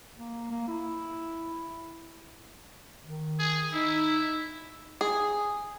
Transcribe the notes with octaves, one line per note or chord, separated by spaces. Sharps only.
A#3
A#3
E4
D#3
G#4
D#4 E4
G#4